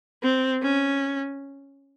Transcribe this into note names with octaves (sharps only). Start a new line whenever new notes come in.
C4
C#4